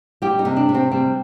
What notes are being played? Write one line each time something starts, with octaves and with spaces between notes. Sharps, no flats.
G3 G4
D#4
C3
D4
C3
C4
G3 C4